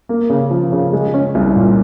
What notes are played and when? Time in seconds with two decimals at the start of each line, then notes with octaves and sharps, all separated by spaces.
0.09 A#3
0.29 C#3
0.50 F3
0.72 C#3
0.93 G#3
1.14 C#4
1.35 C2
1.56 A#2